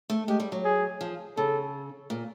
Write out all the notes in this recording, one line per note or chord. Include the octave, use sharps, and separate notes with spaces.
A3
G#3 G4
G3
F#3
G#4
F3
C#3 A4
A#2